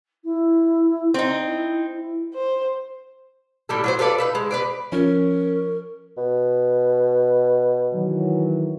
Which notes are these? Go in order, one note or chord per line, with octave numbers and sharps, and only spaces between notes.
E4
C4 D#4 C5
E4
E4
C5
A2 G3 A4
F#3 F#4 C5
F4 A4 B4 D5
D#4 B4 E5
G#3
B4 C5 D5
F3 C#4 A#4
B2
D#3 E3 F#3